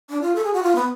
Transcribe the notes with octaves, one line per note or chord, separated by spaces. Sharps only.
D4
F4
A4
G#4
F#4
F4
B3